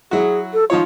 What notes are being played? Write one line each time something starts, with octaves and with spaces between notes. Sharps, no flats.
F#3 E4 F#4 G#4
A4
F3 D#4 F4 C#5